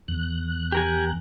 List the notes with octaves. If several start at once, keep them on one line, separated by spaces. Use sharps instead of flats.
E2 F#6
G4 A#4 G#5